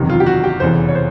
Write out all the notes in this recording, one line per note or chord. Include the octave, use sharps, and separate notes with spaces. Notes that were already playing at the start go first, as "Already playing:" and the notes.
Already playing: F#1 E2 C3 D#3
F4
G4
F#4
G4
F1 E2 C#3 E3 C5
C#5
C5